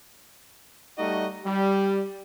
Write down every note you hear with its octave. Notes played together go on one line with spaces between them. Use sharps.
G3 A3 D#4 F#4 D#5
G3